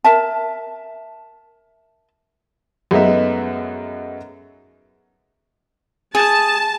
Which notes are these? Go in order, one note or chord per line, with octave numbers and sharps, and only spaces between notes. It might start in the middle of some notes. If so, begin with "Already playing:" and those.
A#4 E5 A5
F#2 G#3 A3 B3 D#4 E5
G#4 A5